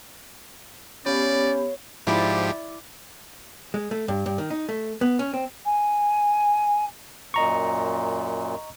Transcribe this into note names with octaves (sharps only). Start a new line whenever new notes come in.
B3 C#4 G4 C#5 D5 F5 B5
G#2 F3 E4 G4 D5
G#3
A3
G2
G2
D#3
D#4
A3
B3
C#4
C4
G#5
F#2 A#2 D#5 A#5 C#6